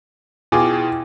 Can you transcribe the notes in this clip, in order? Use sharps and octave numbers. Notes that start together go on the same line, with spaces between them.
B2 E4 F4 G#4 G5 G#5 D6